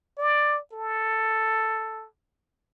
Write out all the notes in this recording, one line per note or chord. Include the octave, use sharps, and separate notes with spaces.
D5
A4